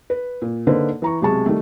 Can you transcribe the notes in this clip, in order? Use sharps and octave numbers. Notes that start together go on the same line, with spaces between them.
B4
A#2
D3 A#3 D#4 B4 C5
E3 A#5 C#6
B1 C3 G#3 G#4 A5 C#6
D#3 G3 A3